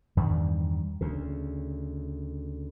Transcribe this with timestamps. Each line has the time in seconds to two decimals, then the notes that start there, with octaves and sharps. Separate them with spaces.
0.17 E2 G2 D#3 G3
1.01 D2 C#3